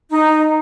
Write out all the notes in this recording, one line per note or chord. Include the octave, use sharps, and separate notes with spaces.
D#4